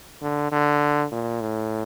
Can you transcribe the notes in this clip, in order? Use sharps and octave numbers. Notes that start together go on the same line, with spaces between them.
D3
D3
A#2
A2